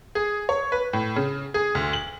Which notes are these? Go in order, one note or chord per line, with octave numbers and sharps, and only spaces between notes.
G#4
C#5
B4
A2
C#3
G#4
D2
F#7